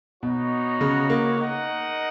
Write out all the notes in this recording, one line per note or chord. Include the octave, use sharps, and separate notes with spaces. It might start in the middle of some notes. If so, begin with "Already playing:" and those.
B2 B3 D#4 F#4 C#5
C#3
A#3
D#4 A#4 D#5 F#5